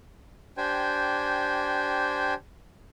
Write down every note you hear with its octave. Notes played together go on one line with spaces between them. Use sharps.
D4 G4 C5 G5 G#5